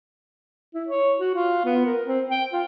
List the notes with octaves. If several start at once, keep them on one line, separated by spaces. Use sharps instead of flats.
E4
C#5
F#4
F4
B3
A#4
C4
G5
F4